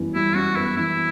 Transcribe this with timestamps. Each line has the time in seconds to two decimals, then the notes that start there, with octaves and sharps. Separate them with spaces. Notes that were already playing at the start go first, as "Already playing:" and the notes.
Already playing: F#2 E3 G3 B3
0.14 G3 E4
0.35 F#2 F#4
0.55 B3 E4
0.77 E3 E4